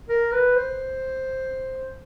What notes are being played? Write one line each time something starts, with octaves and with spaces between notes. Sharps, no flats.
A#4
B4
C5